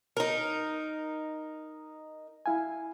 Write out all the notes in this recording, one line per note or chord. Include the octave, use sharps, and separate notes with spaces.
D#4 A#4
E4 F5 G#5